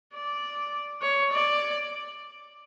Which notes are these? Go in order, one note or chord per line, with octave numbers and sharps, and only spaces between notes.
D5
C#5
D5